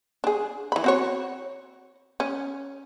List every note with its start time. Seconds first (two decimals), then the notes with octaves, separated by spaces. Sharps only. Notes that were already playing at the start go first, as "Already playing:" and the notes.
0.24 D4 G#4
0.72 E3 B5
0.84 C4 F#4 C#5
2.20 C#4